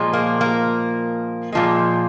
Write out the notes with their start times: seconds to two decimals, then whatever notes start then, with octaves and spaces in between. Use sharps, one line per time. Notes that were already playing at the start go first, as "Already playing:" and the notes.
Already playing: A#2 F3 G#3
0.13 A#3
0.41 A#3
1.52 A#2 F3 G#3